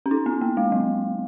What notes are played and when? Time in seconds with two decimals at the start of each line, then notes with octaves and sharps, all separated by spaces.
0.06 C#4
0.11 D#4
0.26 B3
0.41 A#3
0.57 G#3
0.72 F#3